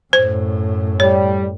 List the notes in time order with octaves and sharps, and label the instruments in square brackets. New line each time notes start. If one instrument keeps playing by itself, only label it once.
[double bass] F#2 A2 [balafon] C5
[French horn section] G3 [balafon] C#5